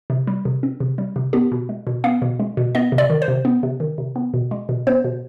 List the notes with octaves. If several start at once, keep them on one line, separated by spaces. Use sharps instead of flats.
C3
G3
C3
C4
C3
G3
C3
B3 G4
B2
G#3
B2
B3 F5
B2
G#3
B2
B3 D#5
C3
D5
D#3
C5
C3
B3
C3
D#3
C3
B3
B2
G#3
B2
B3 C5
B2